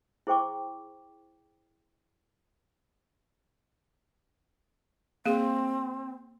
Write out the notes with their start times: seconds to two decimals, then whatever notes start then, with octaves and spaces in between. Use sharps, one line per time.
0.27 E4 G#4 C5 G5 C#6 D6
5.26 A#3 C4 G#4